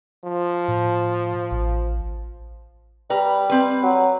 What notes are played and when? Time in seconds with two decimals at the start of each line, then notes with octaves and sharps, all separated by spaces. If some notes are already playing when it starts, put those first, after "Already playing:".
0.24 F3
0.68 A2
1.51 A1
3.10 G3 B4 A#5
3.50 C4 B4
3.83 F#3